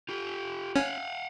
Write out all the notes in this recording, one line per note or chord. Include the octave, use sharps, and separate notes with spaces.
F4 G4
C#4 F5 F#5